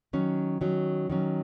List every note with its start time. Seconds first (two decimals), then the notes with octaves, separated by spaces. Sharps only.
0.13 D#3 F#3 C#4
0.61 D#3 F#3 C#4
1.10 D#3 F#3 C#4